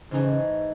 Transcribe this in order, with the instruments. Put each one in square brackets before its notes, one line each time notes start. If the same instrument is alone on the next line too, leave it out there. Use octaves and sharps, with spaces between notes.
[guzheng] G#2 E3 A3 D#4 G#4 [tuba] C#3